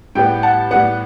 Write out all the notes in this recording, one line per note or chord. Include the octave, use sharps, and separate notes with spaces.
A2 G3 B3 G5
F#5 A5
A2 G3 B3 F#5